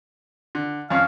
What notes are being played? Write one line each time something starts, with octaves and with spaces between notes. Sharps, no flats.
D3
F2 C#4 F5